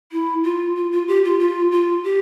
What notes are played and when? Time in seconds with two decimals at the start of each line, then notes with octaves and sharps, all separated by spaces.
0.12 E4
0.44 F4
0.76 F4
0.92 F4
1.08 G4
1.25 F4
1.39 F4
1.72 F4
2.04 G4